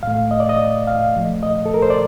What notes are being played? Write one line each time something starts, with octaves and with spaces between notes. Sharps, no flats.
A2 A3 F5
D#5
D5
D#5
F5
A#2 F3 A3
D#5
A4
A#4
C5
D5